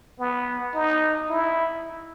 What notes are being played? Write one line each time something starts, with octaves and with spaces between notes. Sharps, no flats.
B3
D#4
E4